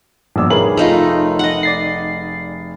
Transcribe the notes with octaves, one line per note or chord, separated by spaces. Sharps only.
A#1 G2 B3 D5 E6
F1 G#4 A#4 B4 C#5 F#7
A3 D#4 F4
D#5 F#5
D5 A6 C7